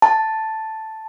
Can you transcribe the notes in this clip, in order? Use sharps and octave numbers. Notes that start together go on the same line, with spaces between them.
A5